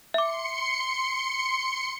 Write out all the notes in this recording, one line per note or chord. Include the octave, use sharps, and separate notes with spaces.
E5 C6 D6 C#7